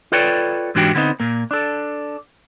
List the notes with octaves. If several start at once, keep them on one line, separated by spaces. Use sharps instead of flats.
F4 A4 B4 C#5 D5 G5
G#2 E3 D4 F#4 G4 G5
D3 B3 C4 D#4
A#2 A#3
D4 A4